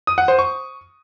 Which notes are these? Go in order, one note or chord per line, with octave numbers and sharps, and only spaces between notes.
D#6
F#5
C5
C#6